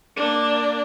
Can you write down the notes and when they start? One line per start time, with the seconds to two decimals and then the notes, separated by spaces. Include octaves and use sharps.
0.16 A#3 D4